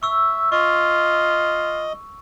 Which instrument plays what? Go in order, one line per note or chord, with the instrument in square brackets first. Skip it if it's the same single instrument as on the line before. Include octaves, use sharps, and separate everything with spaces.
[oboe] E5 [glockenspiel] C#6 E6
[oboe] F4 [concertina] D#5 [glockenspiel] C#6